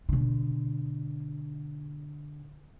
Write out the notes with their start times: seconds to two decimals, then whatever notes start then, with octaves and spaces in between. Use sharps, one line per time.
0.09 B2 D3